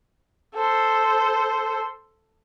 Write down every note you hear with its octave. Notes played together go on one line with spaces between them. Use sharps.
A4 C5